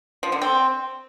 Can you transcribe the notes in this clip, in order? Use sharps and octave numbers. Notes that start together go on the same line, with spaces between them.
F3
D3
C4